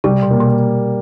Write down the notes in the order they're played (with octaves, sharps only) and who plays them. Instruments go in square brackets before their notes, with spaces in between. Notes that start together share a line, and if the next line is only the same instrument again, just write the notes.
[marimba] C3 [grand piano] G3
[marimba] B2
[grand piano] A#3
[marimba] B2